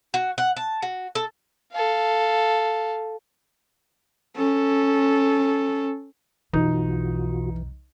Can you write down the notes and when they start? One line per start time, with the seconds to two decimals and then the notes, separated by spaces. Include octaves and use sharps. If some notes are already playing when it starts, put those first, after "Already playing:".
0.14 F#4
0.38 F#5
0.56 A5
0.82 F#4
1.15 A4
1.73 A4 F5
4.36 C#4 A4
6.53 B1 F2 B2 E3 D#4 F4 F#4